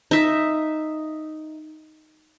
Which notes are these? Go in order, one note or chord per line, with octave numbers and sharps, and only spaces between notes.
D#4 E5